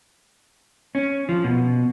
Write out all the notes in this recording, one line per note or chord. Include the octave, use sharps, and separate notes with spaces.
C#4
F3
B2